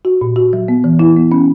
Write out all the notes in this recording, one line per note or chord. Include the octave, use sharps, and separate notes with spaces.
F#4
A#2
F#4
F#3
B3
E3
E4
B3
C#4